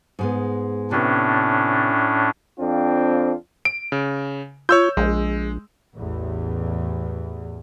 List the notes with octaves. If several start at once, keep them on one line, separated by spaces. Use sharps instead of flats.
G#2 G#3 B3
A2 C3 B3 C#4 D4
F2 C4 D4 F4
D7
C#3
F4 C#5 E6 G6
A#1 G#3
A1 E2